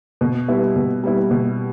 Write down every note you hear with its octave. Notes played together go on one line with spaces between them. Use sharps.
B2
G3 B3 E4
B2
G3 B3 E4
B2